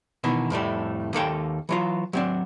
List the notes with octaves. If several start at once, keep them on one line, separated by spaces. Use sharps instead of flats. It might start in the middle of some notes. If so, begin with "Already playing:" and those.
B2 D#3 E3
F2 A2 G3 A3
D#2 A#3 A4 G5
E3 F#3 F4
F#3 C4 D4